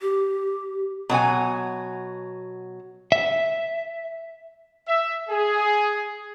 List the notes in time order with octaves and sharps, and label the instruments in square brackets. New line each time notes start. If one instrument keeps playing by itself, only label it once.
[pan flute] G4
[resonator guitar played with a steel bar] B2 F#3 F#4 G#5
[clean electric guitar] E5
[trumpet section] E5
G#4